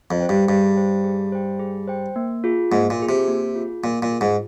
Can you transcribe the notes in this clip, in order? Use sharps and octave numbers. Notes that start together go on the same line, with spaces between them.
F2
C5 G5
G2
G2 G#4
C5 G5
G#4
C5 G5
G#4
C5 G5
A#3
F4 G#4
G#2 A#3
A#2
F4 G#4
C3
A#3
F4 G#4
A#2 A#3
A#2
F4 G#4
G#2